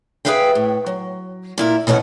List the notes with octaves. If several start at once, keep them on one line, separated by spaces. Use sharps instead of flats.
G#4 A#4 B4 E5 F5 G5
A2
F#3
A#2 E4 A#4
B2 E3 C#4 A#4 F#5